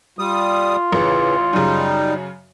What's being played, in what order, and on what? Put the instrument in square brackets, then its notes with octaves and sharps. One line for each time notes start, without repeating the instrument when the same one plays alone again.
[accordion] G3 D#6 [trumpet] F4
[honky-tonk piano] A1 [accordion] C#3 E3
[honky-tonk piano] F#2 C#3 [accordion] G3 D#4